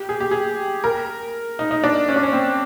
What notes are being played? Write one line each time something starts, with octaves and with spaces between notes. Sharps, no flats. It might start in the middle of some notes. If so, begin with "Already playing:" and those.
Already playing: G4
G#4
G4
G#4
A#4
D#4
D#4
D4
C#4
D4
C#4
C4